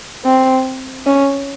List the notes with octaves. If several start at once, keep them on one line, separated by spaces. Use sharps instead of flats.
C4
C#4